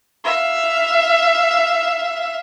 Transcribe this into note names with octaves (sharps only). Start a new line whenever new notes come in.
E5 F5